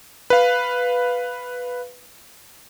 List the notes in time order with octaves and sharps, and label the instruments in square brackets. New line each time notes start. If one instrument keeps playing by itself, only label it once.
[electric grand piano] B4 F5